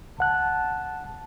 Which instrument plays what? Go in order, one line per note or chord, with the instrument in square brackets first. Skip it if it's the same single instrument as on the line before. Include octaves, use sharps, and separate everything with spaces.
[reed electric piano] C#2 F#5 F#6 [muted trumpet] A5